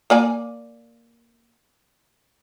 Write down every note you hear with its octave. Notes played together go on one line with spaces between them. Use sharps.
A#3 D5 G#5